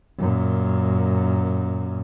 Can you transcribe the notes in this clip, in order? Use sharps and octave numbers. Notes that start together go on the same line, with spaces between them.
F#2 A#2